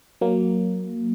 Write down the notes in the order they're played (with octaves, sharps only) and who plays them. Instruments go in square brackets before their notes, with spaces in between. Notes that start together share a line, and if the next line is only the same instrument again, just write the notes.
[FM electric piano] F#3 A#3